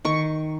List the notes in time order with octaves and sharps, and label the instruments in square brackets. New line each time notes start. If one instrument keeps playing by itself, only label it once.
[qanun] D#3 C#6